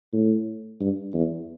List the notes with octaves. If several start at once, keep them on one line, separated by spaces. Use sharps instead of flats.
A2
G2
E2